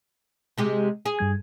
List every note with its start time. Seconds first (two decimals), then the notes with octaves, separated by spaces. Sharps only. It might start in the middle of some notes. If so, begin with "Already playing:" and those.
0.58 C3 G#3 G4
1.06 G#4
1.19 G2 G3 G#6